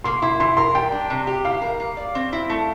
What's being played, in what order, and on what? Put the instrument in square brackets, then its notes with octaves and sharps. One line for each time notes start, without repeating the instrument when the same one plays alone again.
[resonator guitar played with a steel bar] A#3 [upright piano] C6
[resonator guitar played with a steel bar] E4 [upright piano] C6
[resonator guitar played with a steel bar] E3 [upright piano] C6
[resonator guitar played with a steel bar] A#4 [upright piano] C6
[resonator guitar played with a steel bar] G3 [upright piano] G5
[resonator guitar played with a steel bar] D4
C3
G4
[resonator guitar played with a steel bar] E4 [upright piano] F5
[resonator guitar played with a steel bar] A#4
A#3
D5
C4
E4
A3